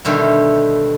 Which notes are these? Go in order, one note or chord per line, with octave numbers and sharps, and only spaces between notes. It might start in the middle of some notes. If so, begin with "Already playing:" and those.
B2 D3 D#3 G3 A3